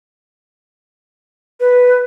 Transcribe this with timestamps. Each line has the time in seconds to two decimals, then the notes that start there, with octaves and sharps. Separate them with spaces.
1.60 B4